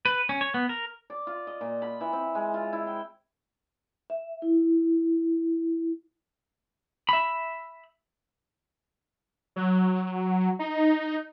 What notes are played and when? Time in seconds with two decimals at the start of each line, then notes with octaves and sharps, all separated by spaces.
0.05 B4
0.29 C#4
0.41 C#5
0.54 B3
0.69 A#4
1.10 D5
1.27 F4
1.47 D#5
1.61 A#2
1.82 B5
2.01 E3
2.13 C4
2.35 G#3
2.54 F4
2.73 E4
2.87 G5
4.10 E5
4.42 E4
7.09 E5 B5
9.56 F#3
10.59 D#4